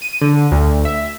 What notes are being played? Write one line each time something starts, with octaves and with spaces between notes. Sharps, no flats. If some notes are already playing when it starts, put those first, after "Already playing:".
D#7
D3
D2
E5